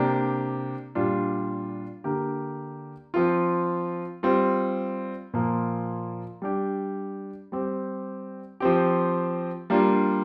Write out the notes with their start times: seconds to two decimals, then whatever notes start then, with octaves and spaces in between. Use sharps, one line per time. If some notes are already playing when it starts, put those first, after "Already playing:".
Already playing: C3 A#3 D4 G4
0.95 A#2 G3 D4 F4
2.04 D3 A#3 G4
3.14 F3 C4 F4
4.23 G3 C4 F4
5.34 A#2 F3 A#3
6.42 G3 D4 G4
7.52 G3 C4 G4
8.60 F3 C4 G4
9.70 G3 A#3 D4 F4